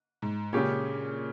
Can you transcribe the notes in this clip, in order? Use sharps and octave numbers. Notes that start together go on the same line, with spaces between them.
G#2
A#2 C#3 G#3 C#4 G4 C#5